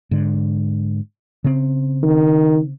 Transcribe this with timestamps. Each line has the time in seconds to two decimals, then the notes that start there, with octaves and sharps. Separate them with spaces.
0.11 G#2 D3
1.44 C#3 C4
2.03 D#3